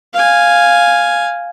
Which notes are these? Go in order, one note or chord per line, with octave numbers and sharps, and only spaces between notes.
F5 G#5